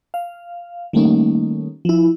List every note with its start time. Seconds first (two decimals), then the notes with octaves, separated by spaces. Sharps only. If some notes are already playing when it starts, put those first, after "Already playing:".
0.14 F5
0.93 D#3 G3 A3 A#3 C#4 D#4
1.85 F3 E4